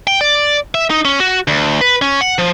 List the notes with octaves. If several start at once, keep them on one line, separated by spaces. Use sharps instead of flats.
G5
D5
E5
D#4
C#4
F#4
D2
B4
C#4
F#5
F3